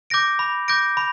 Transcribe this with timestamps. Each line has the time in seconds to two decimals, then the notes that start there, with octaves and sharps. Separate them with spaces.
0.10 D6 G6 A#6 D7
0.39 B5
0.68 D6 G6 A#6 D7
0.97 B5